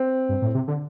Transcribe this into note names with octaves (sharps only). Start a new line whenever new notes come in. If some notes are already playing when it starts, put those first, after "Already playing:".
Already playing: C4
G2
A2
C3
D3